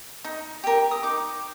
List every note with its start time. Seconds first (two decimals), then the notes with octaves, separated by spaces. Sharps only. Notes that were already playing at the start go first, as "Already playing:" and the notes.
0.24 D#4
0.64 G4 A#4
0.91 D#6
1.03 D#4 D6